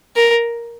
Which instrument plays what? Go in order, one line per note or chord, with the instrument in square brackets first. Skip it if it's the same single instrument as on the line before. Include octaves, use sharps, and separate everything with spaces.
[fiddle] A#4